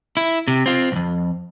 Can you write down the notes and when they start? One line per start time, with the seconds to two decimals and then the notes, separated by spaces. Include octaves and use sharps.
0.17 E4
0.48 C3
0.66 C4 F4
0.92 B1 F2